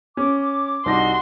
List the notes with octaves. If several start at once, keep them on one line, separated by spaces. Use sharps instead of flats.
C#4 D6
C2 D#4 F#4 C6 A#6